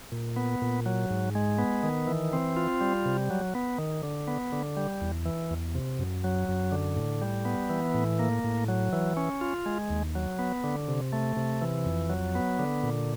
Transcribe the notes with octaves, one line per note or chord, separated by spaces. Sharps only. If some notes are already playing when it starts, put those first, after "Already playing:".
A#2
B3
A#2
F#3
G#2
G#3
B3
D#3
E3
C4
F4
G3
C3
F#3
B3
D#3
D3
B3
D3
G3
E2
E3
E2
C3
F#2
F#3
F#2
D3
A2
G3
B3
E3
A2
A#3
A2
F#3
E3
C#4
F4
G#3
D#2
F#3
B3
D3
C3
A3
C3
E3
F2
F#3
B3
D3
A#2